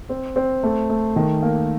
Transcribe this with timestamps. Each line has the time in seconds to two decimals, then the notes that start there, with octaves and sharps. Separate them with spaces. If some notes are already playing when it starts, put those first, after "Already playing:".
0.09 C4
0.36 C4
0.63 A3
0.90 A3
1.16 D#3
1.43 A#3